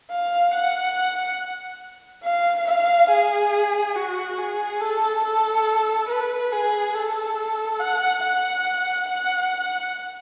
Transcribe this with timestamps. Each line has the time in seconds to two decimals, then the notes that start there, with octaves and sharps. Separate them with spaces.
0.11 F5
0.54 F#5
2.25 F5
2.68 F5
3.10 G#4
3.96 F#4
4.38 G#4
4.81 A4
5.24 A4
6.09 B4
6.52 G#4
6.95 A4
7.80 F#5
8.23 F#5
9.09 F#5